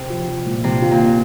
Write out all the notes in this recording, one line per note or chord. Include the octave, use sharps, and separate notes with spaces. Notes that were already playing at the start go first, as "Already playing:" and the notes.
Already playing: C3
F3
F3
A#2
C3 D#3
F4
A#2
F4